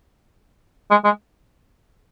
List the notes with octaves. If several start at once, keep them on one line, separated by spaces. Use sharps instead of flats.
G#3
G#3